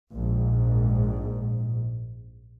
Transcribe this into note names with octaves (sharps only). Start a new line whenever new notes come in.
A#1 G#2